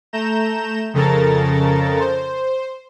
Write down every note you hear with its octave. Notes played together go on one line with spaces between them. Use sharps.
A3 A#5 G6 E7
F2 C#3 A4 A#4 A#5 A6
C5